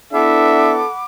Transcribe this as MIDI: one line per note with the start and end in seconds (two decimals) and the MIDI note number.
0.13 0.83 59
0.13 0.83 62
0.13 0.83 64
0.13 0.88 69
0.13 0.74 76
0.13 1.05 78
0.13 1.05 83
0.13 1.05 86